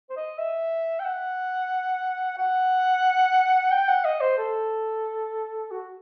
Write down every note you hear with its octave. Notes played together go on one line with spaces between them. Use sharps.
C5
D#5
E5
G5
F#5
F#5
G5
F#5
D#5
C5
A4
F#4